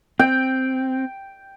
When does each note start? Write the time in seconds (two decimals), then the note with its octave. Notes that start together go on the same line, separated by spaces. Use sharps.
0.19 C4 G5